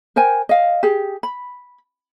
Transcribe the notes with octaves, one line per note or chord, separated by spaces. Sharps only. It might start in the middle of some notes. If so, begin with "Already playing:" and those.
A#4 C5 G5 G#5
D#5 F5
G4 G#4
B5